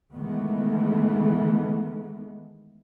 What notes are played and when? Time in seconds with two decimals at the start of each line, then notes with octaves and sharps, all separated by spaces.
0.12 D#3 E3 G#3 A3 B3